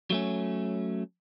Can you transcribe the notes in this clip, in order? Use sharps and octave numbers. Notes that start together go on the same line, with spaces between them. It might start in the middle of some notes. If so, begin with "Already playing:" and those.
F#3 A3 C#4